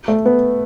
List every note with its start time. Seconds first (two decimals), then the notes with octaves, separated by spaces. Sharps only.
0.08 A3
0.26 B3